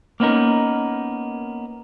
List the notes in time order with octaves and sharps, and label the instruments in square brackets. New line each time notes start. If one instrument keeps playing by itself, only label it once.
[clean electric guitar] A#3 B3 C#4 D#4 A#4